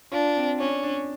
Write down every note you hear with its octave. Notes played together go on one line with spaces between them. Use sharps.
D4 F4
C4
C#4 D4
D4